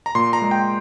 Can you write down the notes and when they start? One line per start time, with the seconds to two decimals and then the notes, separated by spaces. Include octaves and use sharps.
0.06 A#5
0.15 A#2 C6
0.33 A#5
0.42 G#3
0.51 G5